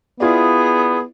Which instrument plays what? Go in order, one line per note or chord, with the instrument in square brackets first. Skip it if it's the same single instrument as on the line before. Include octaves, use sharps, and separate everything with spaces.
[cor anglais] B3 [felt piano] E4 F4 D5 [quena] G#4